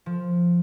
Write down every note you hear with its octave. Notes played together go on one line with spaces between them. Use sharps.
F3